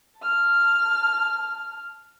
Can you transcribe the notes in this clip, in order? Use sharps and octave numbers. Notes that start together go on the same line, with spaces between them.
A5 F6